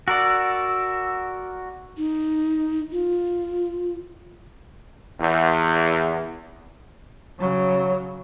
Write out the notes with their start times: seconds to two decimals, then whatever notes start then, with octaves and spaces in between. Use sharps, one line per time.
0.08 F#4 A#4 D5 E6
1.98 D#4
2.92 F4
5.20 E2
7.40 C#3 F#3